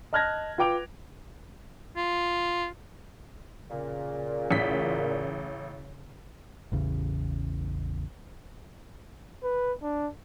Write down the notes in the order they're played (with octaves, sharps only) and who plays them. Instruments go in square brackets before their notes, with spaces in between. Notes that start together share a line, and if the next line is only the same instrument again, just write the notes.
[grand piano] D#5 A5 F6 F#6 G#6 A#6
F4 B4 G5 D6 D7 F7
[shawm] F4
[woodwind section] A#2 [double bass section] C#3
[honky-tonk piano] A1 B6
[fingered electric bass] A1 E2 C#3
[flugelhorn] B4
D4